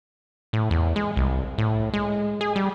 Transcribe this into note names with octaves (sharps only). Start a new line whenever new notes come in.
A2
E2
G#3
C2
A2
G#3
G#4
G3